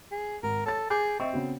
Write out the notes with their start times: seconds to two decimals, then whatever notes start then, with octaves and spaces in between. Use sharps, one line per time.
0.11 G#4
0.43 G#1 A#4
0.66 A4 C#5 A6
0.90 G#4 D6 G6
1.20 C4 D#5 E5 C#6
1.33 C#3 B3 F#4